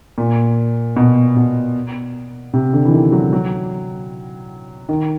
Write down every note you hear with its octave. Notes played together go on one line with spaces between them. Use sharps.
A#2
B2
B2
C3
D3
E3
D#3
F#3
F#3
D#3